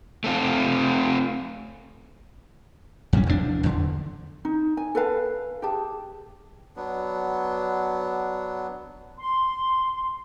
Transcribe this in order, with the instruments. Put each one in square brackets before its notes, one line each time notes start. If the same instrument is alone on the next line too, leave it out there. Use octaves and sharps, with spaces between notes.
[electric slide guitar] A3 C4 F4
[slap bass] F2 G3 C#4
F1 E2 G2 D4
E2 D3
[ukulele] D#4
G#5
A4 B4 F5 A5
G4 G#4 A5
[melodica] F#3 B3 D4
[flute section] C6